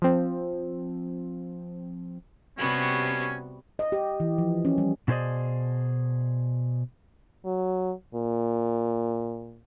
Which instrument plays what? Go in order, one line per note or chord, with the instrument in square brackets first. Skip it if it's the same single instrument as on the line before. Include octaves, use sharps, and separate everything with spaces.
[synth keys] F3 C4
[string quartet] C3 G3 [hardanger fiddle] B3 F#4 [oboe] C#4
[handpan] D#5
G4
E3
F3
C#4
G3
[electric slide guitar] B2 D4 G#4 C5 D5 D#5
[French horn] F#3
A#2